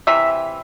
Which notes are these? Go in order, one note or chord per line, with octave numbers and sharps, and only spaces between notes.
C3 E3 E5